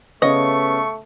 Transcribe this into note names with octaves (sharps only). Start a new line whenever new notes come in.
C#3 A3 B3 C#5 D#5 C#6